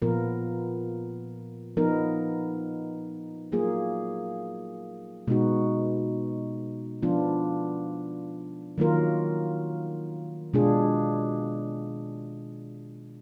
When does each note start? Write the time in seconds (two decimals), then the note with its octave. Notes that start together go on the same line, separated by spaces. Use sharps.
0.02 A#2 F3 B3 F4 A#4
1.77 F3 B3 D#4 A#4
3.52 F#3 A#3 F4 G#4
5.27 B2 G#3 B3 D#4 F#4
7.02 F3 B3 D4 F4
8.78 D#3 F#3 A#3 F4 A#4
10.53 B2 G#3 D4 F4 G#4